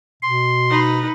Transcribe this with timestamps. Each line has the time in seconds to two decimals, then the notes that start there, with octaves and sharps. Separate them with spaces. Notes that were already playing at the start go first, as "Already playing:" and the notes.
0.23 B2 C6
0.70 D#4 B4